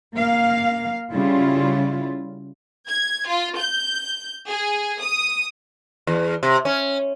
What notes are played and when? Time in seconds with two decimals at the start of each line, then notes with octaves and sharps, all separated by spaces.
0.14 A#3 F5
1.12 C#3 G3 E4 F4
2.88 G#6
3.28 F4
3.59 G6
4.48 G#4
5.02 D#6
6.07 E2
6.43 C3
6.65 C#4